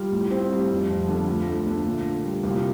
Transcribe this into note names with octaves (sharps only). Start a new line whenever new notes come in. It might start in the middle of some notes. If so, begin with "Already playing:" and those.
Already playing: G3 F4
A2
C4
G3
F2
F3
D3
D2 F4
A3
D3
A#2
A#3
G3
C2 G4
F4
G4